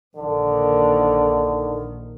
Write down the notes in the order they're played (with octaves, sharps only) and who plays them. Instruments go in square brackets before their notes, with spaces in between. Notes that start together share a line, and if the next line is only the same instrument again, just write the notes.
[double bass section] A#1 D#3 [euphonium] D3